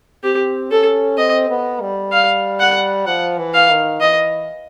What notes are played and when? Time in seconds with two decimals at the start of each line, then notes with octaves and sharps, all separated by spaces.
0.23 C4 G4
0.71 C#4 A4
1.18 C4 D#5
1.50 B3
1.81 G3
2.12 F5
2.60 F#5
3.07 F3 F#5
3.38 E3
3.54 F5
3.70 D#3
4.01 E3 D#5